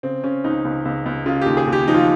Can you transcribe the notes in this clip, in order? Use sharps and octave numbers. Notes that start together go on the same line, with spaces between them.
C#3 C4
C#3 C#4
C#2 D#4
C#2
C#2
C#2
C#3 F4
D#2 G4
G#4
D#2
G4
F3 D#4
F4